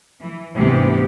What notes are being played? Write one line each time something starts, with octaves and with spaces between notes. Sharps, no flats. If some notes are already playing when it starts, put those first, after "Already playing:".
E3
D2 G#2 C3 E3 B3 G4